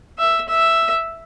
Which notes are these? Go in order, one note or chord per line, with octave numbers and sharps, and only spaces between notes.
E5
E5